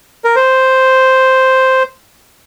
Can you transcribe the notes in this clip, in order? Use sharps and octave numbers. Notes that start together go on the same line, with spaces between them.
A#4
C5